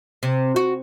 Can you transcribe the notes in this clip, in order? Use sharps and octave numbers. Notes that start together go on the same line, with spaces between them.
C3
F#4